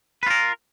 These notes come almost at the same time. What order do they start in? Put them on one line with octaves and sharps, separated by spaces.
B4 F4 A#4